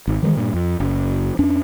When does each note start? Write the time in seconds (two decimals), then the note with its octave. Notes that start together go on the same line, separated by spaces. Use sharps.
0.07 G#1
0.23 D#3 E3 G3 G#3
0.37 G2 A#2
0.53 F2
0.80 F#1
1.39 F2 C#4 D4